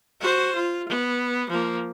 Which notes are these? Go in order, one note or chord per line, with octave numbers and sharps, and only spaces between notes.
F#4 C5
F4
B3
F3 A#3